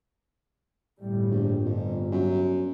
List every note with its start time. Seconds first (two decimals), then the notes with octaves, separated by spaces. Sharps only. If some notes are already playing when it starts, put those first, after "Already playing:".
1.00 G1 A2 G3
1.30 A#1
1.65 G1 F2
2.12 F#2